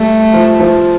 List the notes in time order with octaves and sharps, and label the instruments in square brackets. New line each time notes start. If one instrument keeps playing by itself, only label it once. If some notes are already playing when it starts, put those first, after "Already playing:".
Already playing: [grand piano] G3 [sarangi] A3
[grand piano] F3
F3